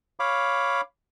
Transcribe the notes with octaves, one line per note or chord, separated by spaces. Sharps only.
C#5 F5 B5 D6